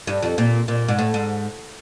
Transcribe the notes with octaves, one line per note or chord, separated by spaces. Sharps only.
G2
F2
A#2
A#2
G#2
A2
G#2